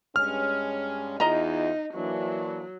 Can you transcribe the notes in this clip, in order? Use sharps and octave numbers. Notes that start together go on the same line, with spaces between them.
G2 G#3 C#4 F6
E2 D#4 F4 D#5 A#5
E3 F#3 A#3 D4